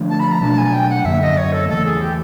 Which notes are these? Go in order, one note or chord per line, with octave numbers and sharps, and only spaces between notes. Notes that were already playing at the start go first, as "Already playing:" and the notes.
Already playing: D3 F3 A3 D4
A5
B5
A#5
B2 F#3 A3 D4 A5
G#5
G5
F#5
F#2 D3 F#3 A#3 E5
D#5
C#5
A4
E2 C#3 E3 A3 A4
G#4
G4